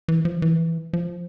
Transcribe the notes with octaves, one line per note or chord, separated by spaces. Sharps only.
E3
F3
E3
F3